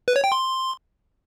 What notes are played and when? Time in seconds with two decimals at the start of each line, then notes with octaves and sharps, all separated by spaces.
0.08 B4
0.16 C#5
0.24 G5
0.32 C6